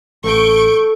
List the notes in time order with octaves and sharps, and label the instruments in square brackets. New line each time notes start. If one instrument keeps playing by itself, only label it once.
[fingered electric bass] A1 [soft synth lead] A4 [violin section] C#6 G6 D7